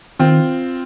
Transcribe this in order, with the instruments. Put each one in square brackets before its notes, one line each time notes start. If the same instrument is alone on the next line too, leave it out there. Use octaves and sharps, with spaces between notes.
[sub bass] D#3 [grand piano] C4 F4